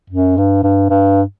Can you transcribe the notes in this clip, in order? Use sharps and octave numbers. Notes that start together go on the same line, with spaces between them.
F#2
G2
G2
G2